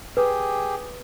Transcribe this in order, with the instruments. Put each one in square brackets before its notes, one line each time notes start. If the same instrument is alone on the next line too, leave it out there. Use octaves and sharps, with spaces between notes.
[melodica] G4 G#4 [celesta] B4